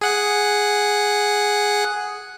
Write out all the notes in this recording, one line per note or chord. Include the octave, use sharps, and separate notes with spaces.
G#4 F#5 F#6